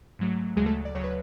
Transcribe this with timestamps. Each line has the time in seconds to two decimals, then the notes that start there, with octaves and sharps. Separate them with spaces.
0.19 G#2 F#3 A3
0.56 D2 C#3 F#3 G#3 G#4
0.66 A3 A4
0.85 D5
0.95 D2 C#3 F#3 C#5
1.04 B4